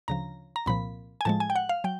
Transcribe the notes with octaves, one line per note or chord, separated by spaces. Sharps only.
D2 C#3 F3 A#5
A#5
C2 A#2 F3 B5
G#5
A2 F3 G#3 A5
G#5
G5
F#5
F5
F#3 G5